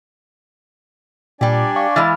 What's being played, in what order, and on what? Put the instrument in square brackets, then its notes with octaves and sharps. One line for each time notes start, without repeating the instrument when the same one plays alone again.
[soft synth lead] A#2 [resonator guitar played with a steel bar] G3 G4 [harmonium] D4 D5 G#5
[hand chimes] F5 D6 [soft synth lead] C#6
[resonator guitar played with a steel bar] E3 G#3 [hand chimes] B5 F6 [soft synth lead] A6